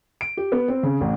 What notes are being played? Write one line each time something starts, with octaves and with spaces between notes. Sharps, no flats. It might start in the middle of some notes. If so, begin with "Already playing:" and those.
D7
G4
B3
C4
C#3
A1